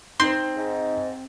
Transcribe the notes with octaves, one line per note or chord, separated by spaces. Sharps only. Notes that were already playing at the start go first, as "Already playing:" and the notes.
C4 D#4 C5 C6
G#2